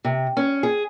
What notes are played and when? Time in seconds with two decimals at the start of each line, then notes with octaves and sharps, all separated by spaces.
0.05 C3
0.37 C#4
0.63 G#4